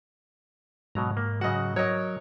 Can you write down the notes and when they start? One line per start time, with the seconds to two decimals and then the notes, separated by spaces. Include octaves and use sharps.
0.95 G#2 B2 F#3 A#5
1.17 A#3
1.41 C#3 F#3 F#4 D#5 F#5
1.76 F#3 A#4 C#5 D#5